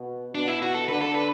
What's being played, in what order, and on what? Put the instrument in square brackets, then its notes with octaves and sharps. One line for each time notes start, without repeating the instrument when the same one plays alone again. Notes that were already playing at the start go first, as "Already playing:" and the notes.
Already playing: [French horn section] B2
[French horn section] B2 [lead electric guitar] D4
[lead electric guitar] E4
F#4
A4
[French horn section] D3 [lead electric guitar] B4
[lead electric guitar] A4
B4